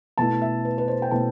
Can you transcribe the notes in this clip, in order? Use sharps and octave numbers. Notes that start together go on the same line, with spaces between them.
B2 A3 E4 A5
E5
B4
B4
C5
G5
B2 A3 E4 A5